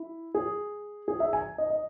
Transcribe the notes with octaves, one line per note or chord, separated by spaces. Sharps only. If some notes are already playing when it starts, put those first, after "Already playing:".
Already playing: E4
G#4
G#4
E5
G#5
D#5
D#5